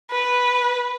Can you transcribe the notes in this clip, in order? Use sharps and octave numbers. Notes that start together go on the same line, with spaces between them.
B4